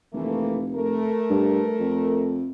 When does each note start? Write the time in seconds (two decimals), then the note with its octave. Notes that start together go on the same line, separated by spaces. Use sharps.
0.13 F1 E3 A3 A#3
0.75 A3 A#4
1.30 G2
1.79 F2